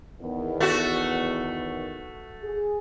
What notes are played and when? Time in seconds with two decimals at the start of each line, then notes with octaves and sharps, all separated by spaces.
0.21 E2 D#3 B3
0.60 A3 F#4
2.42 G#4